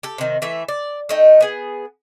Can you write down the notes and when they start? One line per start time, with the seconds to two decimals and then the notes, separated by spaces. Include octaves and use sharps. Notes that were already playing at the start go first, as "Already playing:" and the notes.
0.03 G4 A4
0.18 C3 D#3
0.42 E3 A3 E5
0.68 D5
1.09 A3 D#4 G5
1.41 B3 G#4